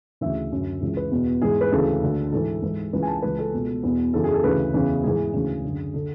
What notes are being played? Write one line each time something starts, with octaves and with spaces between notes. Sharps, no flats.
D2 C#3 E3 E5
F#2 D3
C#2 C#3 E3
B4
E2 B2
G#2 E3 G#4
B4
D2 C#3 E3 A4
D2 D3
G#2 E3 A4
G#2 E3
C#2 C#3 E3 B4
G#5
A5
C#2 C#3 E3 B4
A4
C#2 B2
E2 B2
F#2 C#3 E3 A4
G#4
A4
D2 C#3 E3 B4
E2 C#3 E3
G#2 E3 G#4
D2 C#3 E3
F#2 D3
D3 A4